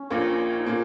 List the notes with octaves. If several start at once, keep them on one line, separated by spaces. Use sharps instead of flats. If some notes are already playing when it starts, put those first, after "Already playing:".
Already playing: C#4
A#1 A#2 A#3
D#4
A#2 A#3 C#4